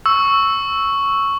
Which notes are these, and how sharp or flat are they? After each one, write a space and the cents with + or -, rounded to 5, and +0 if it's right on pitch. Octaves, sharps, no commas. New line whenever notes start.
C#6 +0 E6 -5